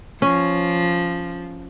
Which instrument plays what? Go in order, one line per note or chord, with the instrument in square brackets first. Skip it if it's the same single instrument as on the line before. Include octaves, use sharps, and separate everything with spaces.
[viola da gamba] F3 [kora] C#4